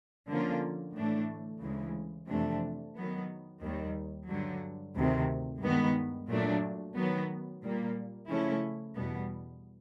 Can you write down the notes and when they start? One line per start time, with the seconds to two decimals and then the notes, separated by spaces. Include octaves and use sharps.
0.29 D3 F3 A#3 C#4 F4
0.96 A2 E3 A3 D4
1.62 D2 C#3 E3 G#3
2.29 F2 C3 E3 A3 D4
2.96 D#3 F#3 B3
3.62 D#2 D#3 G3
4.29 G2 D3 F#3
4.95 D2 C3 D#3
5.62 G2 D#3 G#3 B3
6.29 A#2 F#3 A3 D4
6.95 D#3 F#3 B3
7.62 A#2 G3 A#3
8.29 C#3 F3 A3 C#4 E4
8.95 E2 B2 G3 B3